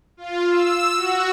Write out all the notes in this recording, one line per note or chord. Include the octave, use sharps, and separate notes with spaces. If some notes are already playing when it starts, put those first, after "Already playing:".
F4
E6
F#4